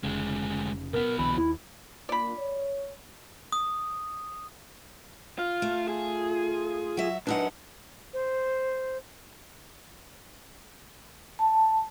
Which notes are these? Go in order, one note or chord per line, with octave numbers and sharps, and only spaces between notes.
F1 D2 C#3 G#3
B1 B3 A#4
C2 D3 E3 B5
D#2 E4
A#3 D4 F4 D5 B5
C#5
D#6
F4 F6
A3
F4 G#4
F#3 E5
F#2 D4 D#4 B4 F#5
C5
A5